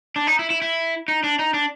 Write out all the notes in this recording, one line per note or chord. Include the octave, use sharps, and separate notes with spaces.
D4
D#4
E4
E4
E4
D#4
D4
D#4
D4